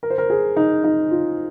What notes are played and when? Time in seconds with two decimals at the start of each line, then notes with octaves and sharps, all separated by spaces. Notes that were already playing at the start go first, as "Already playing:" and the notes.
0.03 A#4
0.10 C5
0.18 A#4
0.30 G#4
0.57 D#4
0.84 D#4
1.11 F4